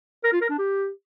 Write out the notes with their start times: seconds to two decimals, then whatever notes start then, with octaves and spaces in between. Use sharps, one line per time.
0.24 A#4
0.32 F4
0.41 A#4
0.50 D4
0.58 G4